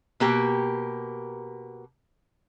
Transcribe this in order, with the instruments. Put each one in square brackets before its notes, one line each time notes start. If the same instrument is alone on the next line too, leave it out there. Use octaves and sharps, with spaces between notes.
[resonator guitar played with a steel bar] B2 A#3 G4 A#4